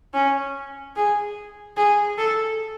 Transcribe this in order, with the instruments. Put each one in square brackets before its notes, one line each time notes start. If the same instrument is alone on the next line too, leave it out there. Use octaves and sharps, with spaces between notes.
[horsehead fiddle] C#4
G#4
G#4
A4